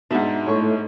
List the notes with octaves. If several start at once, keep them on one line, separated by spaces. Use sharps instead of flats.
G#2 B2 D4 D#4 A4 E5 F#5
A2 A3 C#5 C#6